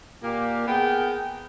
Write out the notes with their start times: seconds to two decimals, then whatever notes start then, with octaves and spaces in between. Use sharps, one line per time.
0.23 A#2 A#3 G4
0.67 B3 G#4 A#4 G5